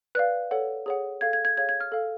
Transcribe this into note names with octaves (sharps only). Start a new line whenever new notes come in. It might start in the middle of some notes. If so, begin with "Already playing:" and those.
B4 D5 F5 F#6
A4 C#5 F#5
G#4 C#5 F#5
A4 F5 G#6
G#6
G#6
G#4 C#5 F5 G#6
G#6
F6
A4 F5